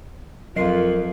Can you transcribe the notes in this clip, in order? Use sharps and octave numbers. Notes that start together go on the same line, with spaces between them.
F2 F#3 F4 A#4 C7